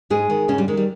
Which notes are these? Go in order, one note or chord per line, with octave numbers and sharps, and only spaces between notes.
G#2 G#3 G#4
D#3
G#2 C#3 C#4
G3
D#3 G#3
G3